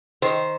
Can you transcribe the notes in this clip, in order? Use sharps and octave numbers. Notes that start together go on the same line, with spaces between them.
D#3 C5